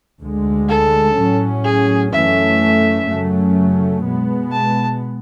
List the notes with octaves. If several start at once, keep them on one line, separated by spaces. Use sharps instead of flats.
D2 D3 G#3
A4
A2 F#3 C#4
G#4
F#2 E3 A3 C#4 E5
F#2 C#3 F#3 A3 C#4
B2 G#3 B3
A5